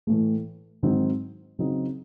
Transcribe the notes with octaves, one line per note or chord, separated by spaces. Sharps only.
A2 E3 A3
G#2 D#3 F#3 C4 D#4
C#3 F#3 C4 D#4